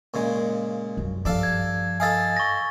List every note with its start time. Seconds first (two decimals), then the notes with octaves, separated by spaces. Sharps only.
0.14 A#2 C#3 G#3
0.97 F#2 G3
1.25 G2 F3 D4 A4 F5
1.43 G#6
2.00 A4 D#5 F5 G#5 A6
2.37 C#6 A#6